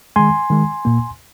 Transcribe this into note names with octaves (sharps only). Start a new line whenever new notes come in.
D#3 G#3 G#5 C6
D#3 G#3
A#2 A#3